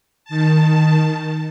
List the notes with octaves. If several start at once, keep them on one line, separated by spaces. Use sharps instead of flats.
D#3 A5